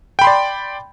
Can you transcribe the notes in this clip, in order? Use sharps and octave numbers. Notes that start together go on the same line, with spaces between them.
D5 G5 B5 C6